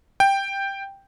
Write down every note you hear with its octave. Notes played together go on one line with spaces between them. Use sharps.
G5